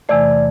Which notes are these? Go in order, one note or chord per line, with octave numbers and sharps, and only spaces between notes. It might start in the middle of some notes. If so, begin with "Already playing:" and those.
E2 C3 E3 A3 D5